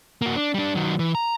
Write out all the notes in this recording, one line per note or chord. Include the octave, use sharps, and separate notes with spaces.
A#3 F#4
D4
G3 D4
D#3 F#3
E3
A#5